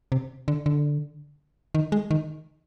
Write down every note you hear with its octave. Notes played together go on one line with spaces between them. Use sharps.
C3
D3
D3
D#3
G#3
D#3